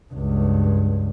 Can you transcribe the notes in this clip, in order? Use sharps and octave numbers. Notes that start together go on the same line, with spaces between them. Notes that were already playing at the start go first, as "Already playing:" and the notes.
C#2 G2